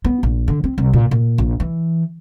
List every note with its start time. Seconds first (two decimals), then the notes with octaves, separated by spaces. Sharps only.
0.04 B3
0.23 A#1
0.48 D3
0.64 C4
0.78 C2
0.93 A#2
1.11 A#2
1.38 A#1
1.60 E3